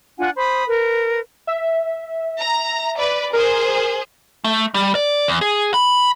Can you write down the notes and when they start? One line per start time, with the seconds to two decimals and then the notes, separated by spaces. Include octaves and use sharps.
0.18 D4 F4 F#5 G#5
0.37 C5 B5 D#6
0.68 A#4 B4
1.47 E5
2.42 A#5
2.97 B4 D5
3.33 G#4 A#4 C5
4.44 A3
4.74 G3
4.95 D5
5.28 E2
5.41 G#4
5.74 B5